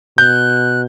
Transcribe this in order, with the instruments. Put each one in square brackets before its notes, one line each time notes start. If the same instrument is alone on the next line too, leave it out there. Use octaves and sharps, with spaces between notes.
[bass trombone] B2 [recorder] F#6 [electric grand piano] G6